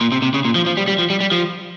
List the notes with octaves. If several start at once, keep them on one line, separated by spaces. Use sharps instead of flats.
A#2
C3
C3
C#3
A#2
F3
F3
G3
G3
F3
G3
G3
F3